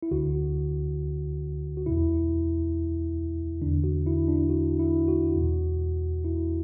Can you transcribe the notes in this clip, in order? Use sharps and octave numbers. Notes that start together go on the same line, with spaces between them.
E4
D2 D3 F#4
F#4
E2 B2 E4
E2 D3 D4
F#4
E4
D4
F#4
E4
F#4
E2 B2
E4